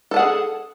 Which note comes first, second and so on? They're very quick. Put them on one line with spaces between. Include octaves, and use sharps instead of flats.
A4 A5 F#5 G#4